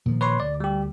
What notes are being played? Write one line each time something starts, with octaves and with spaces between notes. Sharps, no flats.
A#2 D#3 F3
B4 C#5 C6
D2 D5
G3 G4